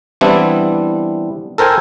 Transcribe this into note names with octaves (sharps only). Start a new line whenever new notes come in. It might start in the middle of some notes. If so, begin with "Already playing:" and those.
E3 G3 B3 C4 D4 E4
A4 A#4 C5 G5 G#5